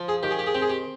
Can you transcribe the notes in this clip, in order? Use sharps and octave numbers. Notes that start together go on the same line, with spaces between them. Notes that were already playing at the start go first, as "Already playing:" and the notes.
Already playing: F3
G#4
D#3 G4
G#4
G4
G#4
C4 G4
G#4
G4